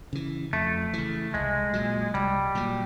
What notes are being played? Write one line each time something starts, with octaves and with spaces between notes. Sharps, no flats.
C#3 E3
F2 A3
C#3 E3
C2 G#3
A#2 F#3
C2 G3
A#2 F#3